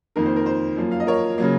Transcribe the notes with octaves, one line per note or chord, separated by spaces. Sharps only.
F2 D#3 A#3 A#4
C5
A#4
C5
F#2 F3 A#3
F5
D#5
A#4 C#5
C#3 F#3 A#3